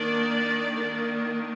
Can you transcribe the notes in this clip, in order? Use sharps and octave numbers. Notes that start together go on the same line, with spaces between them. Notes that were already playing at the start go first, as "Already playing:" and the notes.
Already playing: D#3 A#3 D4 D5
D#3 A#3 D4